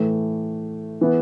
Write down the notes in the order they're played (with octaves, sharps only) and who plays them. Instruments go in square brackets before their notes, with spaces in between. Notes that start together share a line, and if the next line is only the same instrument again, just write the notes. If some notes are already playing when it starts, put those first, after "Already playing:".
Already playing: [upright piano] A2 E3 A3
E3 B3